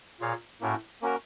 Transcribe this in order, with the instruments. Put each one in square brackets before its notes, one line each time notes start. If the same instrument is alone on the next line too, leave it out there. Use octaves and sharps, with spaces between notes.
[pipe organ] A#2 [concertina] F4 G#4 C#5 F5
[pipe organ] A2 [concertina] A#3 C#4 F#4 A#4
[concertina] A#3 C#4 F#4 A#4